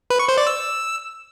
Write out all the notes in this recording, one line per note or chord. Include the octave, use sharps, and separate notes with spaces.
B4
C#6
C5
D5
E6